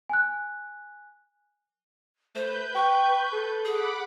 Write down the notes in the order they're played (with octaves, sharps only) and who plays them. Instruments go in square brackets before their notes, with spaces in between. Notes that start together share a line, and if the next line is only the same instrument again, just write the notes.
[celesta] G#5 F#6
[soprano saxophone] A3 [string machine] B4 G6 [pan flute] C5
[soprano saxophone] G5 [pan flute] C#6
[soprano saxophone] A4
[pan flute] G#4 [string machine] F#5 B5 D6